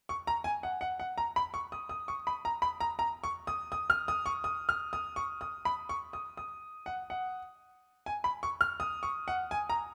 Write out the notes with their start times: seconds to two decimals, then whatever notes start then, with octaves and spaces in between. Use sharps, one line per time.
0.09 C#6
0.27 A#5
0.44 G#5
0.63 F#5
0.81 F#5
1.00 F#5
1.18 A#5
1.36 B5
1.54 C#6
1.72 D#6
1.89 D#6
2.08 C#6
2.27 B5
2.45 A#5
2.62 B5
2.80 A#5
2.99 A#5
3.24 C#6
3.47 D#6
3.72 D#6
3.90 F6
4.08 D#6
4.26 C#6
4.44 D#6
4.69 F6
4.93 D#6
5.16 C#6
5.41 D#6
5.65 B5
5.89 C#6
6.13 D#6
6.37 D#6
6.86 F#5
7.10 F#5
8.06 G#5
8.24 B5
8.43 C#6
8.61 F6
8.80 D#6
9.03 C#6
9.28 F#5
9.51 G#5
9.70 A#5